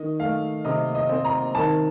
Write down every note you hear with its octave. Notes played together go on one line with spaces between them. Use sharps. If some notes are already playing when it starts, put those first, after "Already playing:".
Already playing: D#3 D#5
A3 F5
C3 D#5
D#5
C4
A#5
D#3 A5